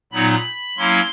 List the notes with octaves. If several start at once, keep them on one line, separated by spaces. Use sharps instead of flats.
A#2 F#3 B3 D#4 B5
F#3 A#3 C#4 E4 C6